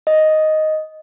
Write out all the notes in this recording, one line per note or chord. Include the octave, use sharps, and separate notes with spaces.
D#5